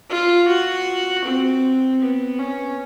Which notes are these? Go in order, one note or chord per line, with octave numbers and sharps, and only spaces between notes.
F4
F#4
C4
B3
C#4